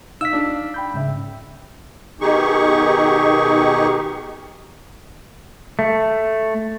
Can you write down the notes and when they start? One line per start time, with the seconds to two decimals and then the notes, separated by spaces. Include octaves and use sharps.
0.21 D#4 F5 E6 F6 B6
0.33 D4
0.74 G5 B5 G6
0.94 G#2 C#3 E5
2.21 B2 D#3 D#4 G4 G#4 C#6
5.79 A3